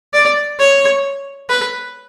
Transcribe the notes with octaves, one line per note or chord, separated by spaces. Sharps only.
D5
C#5
B4